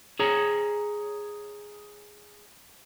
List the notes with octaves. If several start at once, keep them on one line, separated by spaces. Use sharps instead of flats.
G#4 C#5 A#5